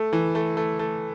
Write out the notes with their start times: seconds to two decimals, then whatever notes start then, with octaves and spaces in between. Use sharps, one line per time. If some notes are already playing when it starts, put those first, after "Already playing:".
Already playing: A3
0.13 E3
0.35 A3
0.57 A3
0.79 A3